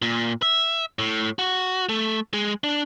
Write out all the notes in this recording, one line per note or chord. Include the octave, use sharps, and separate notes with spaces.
A#2
E5
A2
F#4
A3
G#3
D4